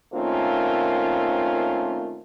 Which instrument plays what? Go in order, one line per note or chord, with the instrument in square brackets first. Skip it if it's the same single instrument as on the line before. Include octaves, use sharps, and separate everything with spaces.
[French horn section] D#3 A3 A#3 C4 C#4 F4